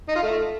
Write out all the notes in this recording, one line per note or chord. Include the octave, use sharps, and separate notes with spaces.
D#4
F4
A3